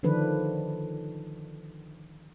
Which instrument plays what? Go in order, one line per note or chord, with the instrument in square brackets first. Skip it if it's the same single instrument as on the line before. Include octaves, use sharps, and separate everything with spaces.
[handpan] D3 D#3 F3 D4 B4